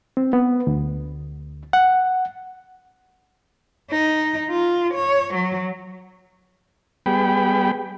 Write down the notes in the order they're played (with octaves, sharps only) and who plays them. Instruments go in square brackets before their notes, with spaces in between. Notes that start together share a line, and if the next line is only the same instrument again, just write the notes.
[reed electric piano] C4
B3
D2
F#5
[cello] D#4
F4
C#5
F#3
[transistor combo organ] G3 B3 G#4 G5 B5